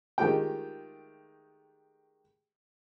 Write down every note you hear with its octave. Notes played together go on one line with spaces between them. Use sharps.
D#3 G#3 A3 F4 G4 G5